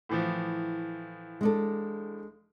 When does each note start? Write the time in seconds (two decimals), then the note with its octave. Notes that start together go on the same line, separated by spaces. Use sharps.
0.09 A2 E3 F3
1.41 G#3 D4 A4